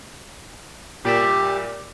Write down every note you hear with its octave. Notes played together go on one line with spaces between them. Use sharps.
A#2 G3 G4 D5 E5